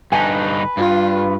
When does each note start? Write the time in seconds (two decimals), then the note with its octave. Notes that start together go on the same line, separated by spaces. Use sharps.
0.12 G2 D3 D#4 B4 G#5 A5
0.77 G2 F4